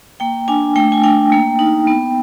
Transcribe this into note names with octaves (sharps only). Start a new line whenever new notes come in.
A#3 G5
D4 G#5
A3 G5
G#5
D4 G5
A#3
D#4
B3